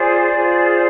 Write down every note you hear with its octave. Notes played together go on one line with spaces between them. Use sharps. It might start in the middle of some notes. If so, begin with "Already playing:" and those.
Already playing: F4 G#4 C5 D5
F4 G#4 C5